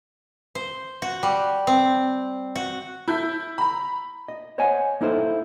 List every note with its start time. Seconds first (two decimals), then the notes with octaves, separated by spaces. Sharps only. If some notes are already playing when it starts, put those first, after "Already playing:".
0.55 C5
1.02 F#4
1.23 G3
1.67 C4
2.55 F#4
3.08 E4 G6 B6
3.58 A#5 B5
4.28 D#5
4.58 C5 C#5 D#5 F#5 G#5
5.01 A#3 D#4 E4 A4 C5